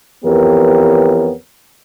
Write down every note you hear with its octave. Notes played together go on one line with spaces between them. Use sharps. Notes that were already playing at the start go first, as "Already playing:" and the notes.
F2 E3 B3 G4 A#4 C#5